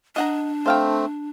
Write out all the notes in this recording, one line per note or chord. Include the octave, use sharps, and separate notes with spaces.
D4 D#5 F#5 A#5
A3 C4 C5 F5 G5